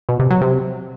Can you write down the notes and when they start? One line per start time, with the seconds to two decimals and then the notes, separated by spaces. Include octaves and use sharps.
0.09 B2
0.20 C3
0.30 F#3
0.41 C3